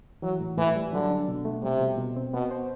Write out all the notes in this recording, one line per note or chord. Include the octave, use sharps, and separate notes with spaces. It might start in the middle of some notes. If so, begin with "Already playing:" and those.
E3 F#3
A2
A2 E3
G3
D3 F#3
D4
B2
A3
C3 G3
B2
B2
C4
B2 B3
C5